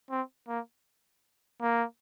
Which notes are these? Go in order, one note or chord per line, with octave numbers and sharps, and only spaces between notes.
C4
A#3
A#3